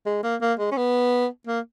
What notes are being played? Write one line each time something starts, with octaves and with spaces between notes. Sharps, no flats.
G#3
A#3
A#3
G#3
C#4
B3
A#3